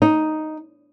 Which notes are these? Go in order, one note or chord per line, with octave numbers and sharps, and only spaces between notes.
D#4